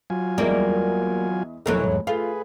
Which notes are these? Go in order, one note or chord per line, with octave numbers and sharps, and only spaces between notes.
F#3 F4 G#5
E2 G3 G#3 A#3 E4 D5
F1 B2 E3 F#3 A3 A#4
E2 G#2
A3 F4 G#4 B4